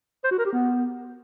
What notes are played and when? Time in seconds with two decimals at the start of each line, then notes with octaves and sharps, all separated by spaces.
0.24 C5
0.31 F#4
0.38 A#4
0.45 G4
0.52 B3